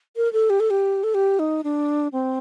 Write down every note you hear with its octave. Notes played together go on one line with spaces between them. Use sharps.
A#4
A4
G4
A4
G4
A4
G4
D#4
D4
C4